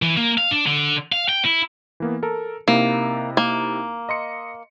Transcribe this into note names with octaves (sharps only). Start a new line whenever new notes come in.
E3
A#3
F5
D4
D3
F5
G5
E4
E3 A#3 B3
A4 A#4
C3 A#3 D#4 E4
A#3
D#5 C6 C#7